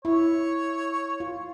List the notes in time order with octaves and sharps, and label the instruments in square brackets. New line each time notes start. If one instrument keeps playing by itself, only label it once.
[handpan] E4 [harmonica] C#5
[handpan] F4